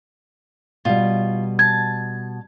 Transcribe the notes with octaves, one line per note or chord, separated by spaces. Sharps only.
B2 G3 F4
A5 G#6